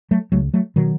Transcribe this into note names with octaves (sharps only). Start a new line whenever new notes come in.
F#3 A3
C#2 C#3 F#3 A3
F#3 A3
B2 D#3 F#3